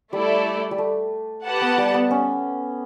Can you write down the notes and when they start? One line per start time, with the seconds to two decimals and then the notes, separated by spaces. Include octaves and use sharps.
0.12 G3 A3 E4 A4 D5
0.71 G3
0.78 A3
1.45 G4 B4 F#5 A5
1.61 B3
1.78 G3
1.94 B3
2.11 C#4